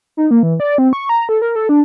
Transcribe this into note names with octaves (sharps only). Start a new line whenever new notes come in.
D#4
A#3
E3
D5
C4
C#6
A#5
A4
A#4
A4
D4